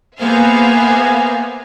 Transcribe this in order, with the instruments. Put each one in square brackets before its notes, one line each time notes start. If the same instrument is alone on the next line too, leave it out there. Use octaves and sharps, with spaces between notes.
[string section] A#3 B3 G#4 C5 E5 F5